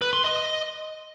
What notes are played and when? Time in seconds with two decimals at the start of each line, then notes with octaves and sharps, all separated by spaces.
0.01 B4
0.13 C6
0.24 D#5